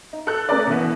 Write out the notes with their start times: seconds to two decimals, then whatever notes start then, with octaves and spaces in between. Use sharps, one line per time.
0.13 D#4
0.27 A4 F#6
0.49 A3 C#4 G#4 A#4 B4 D5
0.67 B2 E3 B3